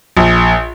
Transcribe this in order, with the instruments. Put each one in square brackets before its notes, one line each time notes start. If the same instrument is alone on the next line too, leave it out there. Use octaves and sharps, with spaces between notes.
[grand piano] A#1